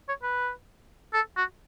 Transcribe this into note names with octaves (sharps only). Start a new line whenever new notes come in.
C#5
B4
A4
F#4